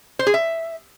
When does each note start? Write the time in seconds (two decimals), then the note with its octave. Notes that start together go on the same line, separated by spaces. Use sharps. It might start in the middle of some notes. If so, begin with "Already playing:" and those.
0.19 C5
0.27 G#4
0.34 E5